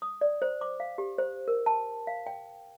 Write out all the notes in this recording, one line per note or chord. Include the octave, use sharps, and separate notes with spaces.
D#6
D5
C5
D6
F5
G4
C5
A#4
A5
F5
G5